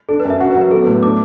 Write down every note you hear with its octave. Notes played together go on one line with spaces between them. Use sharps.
D4 A4
B4
F#2
E5
F#4 F#5
B4
F#3
B4
B3 A4
A4
A2 B4
D4 D6